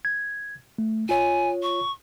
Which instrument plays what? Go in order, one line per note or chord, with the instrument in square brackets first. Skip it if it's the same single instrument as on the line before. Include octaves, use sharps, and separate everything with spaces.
[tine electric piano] G#6
A3
[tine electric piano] F4 C#5 [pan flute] G#5
[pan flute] C#6